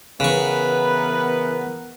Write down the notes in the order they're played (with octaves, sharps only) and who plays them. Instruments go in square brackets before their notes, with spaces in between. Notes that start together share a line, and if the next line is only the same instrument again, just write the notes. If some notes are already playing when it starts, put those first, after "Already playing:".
[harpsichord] C#3 C#6 [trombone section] E3 B3 A#4 [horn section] B4